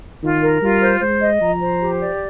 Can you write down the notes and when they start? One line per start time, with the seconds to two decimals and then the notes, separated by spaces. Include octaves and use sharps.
0.23 D#3 F4
0.42 A#4
0.61 G3 F4
0.82 C5
1.01 G#3 C5
1.21 D#5
1.41 F3 A#5
1.61 C5
1.81 G4
2.00 D5